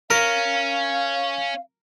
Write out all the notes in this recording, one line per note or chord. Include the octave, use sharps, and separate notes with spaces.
C#4 A#4 F5